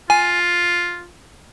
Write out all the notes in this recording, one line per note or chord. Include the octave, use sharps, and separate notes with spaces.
F4 G#5